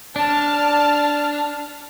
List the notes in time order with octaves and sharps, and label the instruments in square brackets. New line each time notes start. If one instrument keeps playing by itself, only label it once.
[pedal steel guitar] D4 [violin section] A5 F6